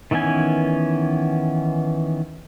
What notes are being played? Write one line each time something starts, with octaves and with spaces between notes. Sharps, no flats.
D#3 E3 B3 C#4 G#5